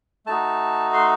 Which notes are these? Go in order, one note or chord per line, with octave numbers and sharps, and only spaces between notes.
A3 D#4 F#4 A5
C6